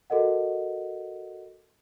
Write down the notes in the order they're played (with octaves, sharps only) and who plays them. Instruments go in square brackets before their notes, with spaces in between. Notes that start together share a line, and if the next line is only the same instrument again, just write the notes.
[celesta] F#4 A4 A#4 D#5 F#5